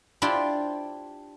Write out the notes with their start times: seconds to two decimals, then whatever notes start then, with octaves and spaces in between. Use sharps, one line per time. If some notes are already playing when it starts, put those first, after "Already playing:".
0.22 D4 E4 F4 G4 C5 G5